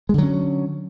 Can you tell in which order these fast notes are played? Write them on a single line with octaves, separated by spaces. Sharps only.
G#3 D3 F#3 C#4